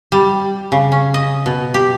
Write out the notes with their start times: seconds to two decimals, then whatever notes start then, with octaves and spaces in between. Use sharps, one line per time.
0.12 G3
0.72 C#3
0.92 C#4
1.14 D#5
1.46 B2
1.74 G4